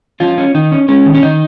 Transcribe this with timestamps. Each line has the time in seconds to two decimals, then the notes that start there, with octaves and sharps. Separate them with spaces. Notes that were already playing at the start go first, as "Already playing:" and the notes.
0.20 F3 C#4 F4
0.38 C#4
0.54 D#3 D#4
0.72 C#4
0.88 G#3 C#4
1.06 D#3
1.15 C#4
1.23 D#3 D#4